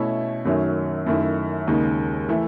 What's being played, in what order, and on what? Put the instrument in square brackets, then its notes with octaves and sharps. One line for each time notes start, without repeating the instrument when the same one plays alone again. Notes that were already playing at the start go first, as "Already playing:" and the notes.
Already playing: [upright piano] B2 A3 C#4 E4
F#2 D#3 F#3 A3 C#4
F#2 D#3 A3 E4
D#2 C#3 G#3 D#4
E3 A3 E4